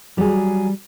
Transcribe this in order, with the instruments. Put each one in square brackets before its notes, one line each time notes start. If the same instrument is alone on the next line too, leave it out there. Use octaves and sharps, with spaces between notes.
[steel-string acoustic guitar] F#3 G#4 [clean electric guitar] G3